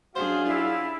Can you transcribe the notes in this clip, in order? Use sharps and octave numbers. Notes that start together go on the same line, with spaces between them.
F#2 D4 F#4 G#4 C5 F5
E4 F4